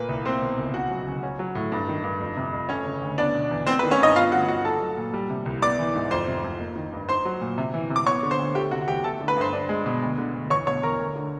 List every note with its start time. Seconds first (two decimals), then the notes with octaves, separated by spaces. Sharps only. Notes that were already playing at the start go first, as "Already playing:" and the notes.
Already playing: A#2 A#3 B4
0.09 C2
0.25 A#3 C4 C5
0.42 B2
0.58 C#2
0.74 C#3 F#4 F#5
0.91 F#3
1.07 C#3
1.23 C#4
1.39 F#3
1.55 A2
1.72 G2
1.88 D#3
2.04 G2
2.20 F2
2.37 C3
2.53 F2
2.69 A3 C#4 C#5
2.86 C#3
3.01 D2
3.18 B3 D4 D5
3.34 B2
3.51 E2
3.67 B3 C4 C5
3.79 B4
3.83 D#3
3.91 C#4 C#5
4.00 G2 D#4 D#5
4.16 B3 F4 F5
4.32 D3 F#4 F#5
4.48 G2 F#4 F#5
4.64 D#4 A4 A5
4.81 F#3
4.97 A#2
5.14 G3
5.30 C3
5.46 C2
5.62 B3 D5 D6
5.79 E3
5.95 G#2
6.11 F2 C5 C6
6.27 C3
6.44 F2
6.60 A#3
6.76 D#3
6.93 G2
7.09 D#4 C5 C6
7.25 F#3
7.41 A#2
7.58 C3
7.74 E3
7.90 C3
7.96 D6
8.06 B3 C#5 C#6
8.23 D3
8.31 C5 C6
8.39 D2
8.55 A3 G4 G5
8.71 C3 F#4 F#5
8.88 E2 G4 G5
9.04 A3 A4 A5
9.21 D3
9.28 B4 B5
9.37 G2 C5 C6
9.53 D4
9.69 G#3
9.86 B2
10.02 D2
10.18 D3
10.34 D2
10.50 E2 C#5 C#6
10.67 B2 C#5 C#6
10.83 E2 A#4 A#5
11.00 D2
11.16 D3